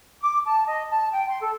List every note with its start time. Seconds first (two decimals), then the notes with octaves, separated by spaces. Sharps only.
0.21 D6
0.46 A5
0.66 D#5
0.90 A5
1.13 G5
1.29 C6
1.41 A4